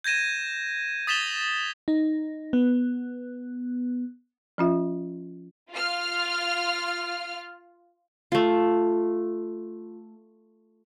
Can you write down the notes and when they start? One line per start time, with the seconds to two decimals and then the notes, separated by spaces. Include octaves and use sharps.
0.04 G6 G#6 A#6 D#7 E7
1.07 D#6 A6 B6 E7 F7 G7
1.88 D#4
2.53 B3
4.58 F3 C#4 F4 E5
5.71 F4 F6
8.32 A3 F4